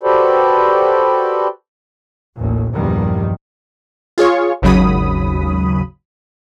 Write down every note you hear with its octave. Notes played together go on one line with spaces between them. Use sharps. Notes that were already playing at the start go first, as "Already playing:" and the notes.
F#4 G4 A4 B4 C5 D5
A1 D#2 A#2
A#1 E2 G2 D#3 F3 G3
F4 G#4 C#5 C#6
G#1 D#2 C#3 F#3 B5 D#6